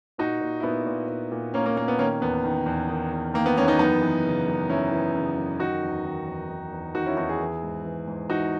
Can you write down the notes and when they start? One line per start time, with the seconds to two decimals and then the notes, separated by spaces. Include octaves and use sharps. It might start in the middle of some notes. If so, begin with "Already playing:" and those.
0.18 A#2 D#4 F#4
0.41 A#2
0.60 E4
0.63 A#2 B3 D#4
0.86 A#2
1.08 A#2
1.32 A#2
1.54 A#2 A#3 C#4
1.66 A#3
1.76 A#2 A#3
1.88 B3
1.99 D#3 A#3 C#4
2.21 E2 B3
2.45 D#3
2.66 E2
2.89 D#3
3.12 E2
3.34 D#3 A#3
3.46 B3
3.57 E2 A#3 C#4
3.68 B3 D#4
3.79 F#2 B3 D#4
4.01 E3
4.25 C#3
4.48 F#2
4.69 F#2 C#4 E4
4.92 E3
5.15 C#3
5.37 F#2
5.60 D#3 D#4 F#4
5.83 E2
6.05 D#3
6.27 E2
6.49 D#3
6.72 E2
6.95 D#3 D#4 F#4
7.06 C#4 E4
7.17 E2 D#4 F#4
7.29 E4 G#4
7.40 E3
7.63 G#2
7.85 E3
8.08 G#2
8.30 E3 D#4 F#4